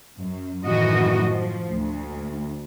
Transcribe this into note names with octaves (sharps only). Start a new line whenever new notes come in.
F#2
F#2 A2 D#3 E3 F#4 D#5
F3
D2